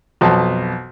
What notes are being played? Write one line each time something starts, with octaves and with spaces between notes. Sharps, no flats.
B1 F2 B2 A5